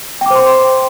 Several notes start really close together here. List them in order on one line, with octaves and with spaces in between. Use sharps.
G5 D6 C5 C6